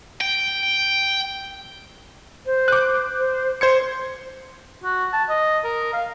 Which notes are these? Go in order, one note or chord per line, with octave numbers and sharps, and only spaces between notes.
G5
C5
D6 F#6
C5
C5 C6 G#6 C#7
F#4
A5
D#5
A#4
F5